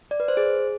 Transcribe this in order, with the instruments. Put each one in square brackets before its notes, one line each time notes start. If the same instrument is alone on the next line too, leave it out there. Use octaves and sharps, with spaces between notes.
[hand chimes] D5
B4
C5
G#4